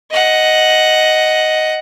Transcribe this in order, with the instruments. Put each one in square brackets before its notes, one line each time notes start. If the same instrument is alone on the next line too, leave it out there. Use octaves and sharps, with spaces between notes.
[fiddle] D#5 F#5